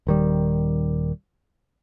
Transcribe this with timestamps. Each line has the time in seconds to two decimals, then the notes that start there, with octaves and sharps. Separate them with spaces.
0.07 D#1 D#3 G3